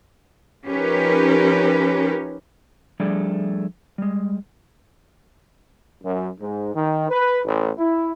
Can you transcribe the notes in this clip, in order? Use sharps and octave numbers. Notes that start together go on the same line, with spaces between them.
F3 C#4 D#4 G4 A#4 B4
F3 G3 A3 D4 G#4 D5
G3 G#3
F#2
G#2
D#3
B4
A1
E4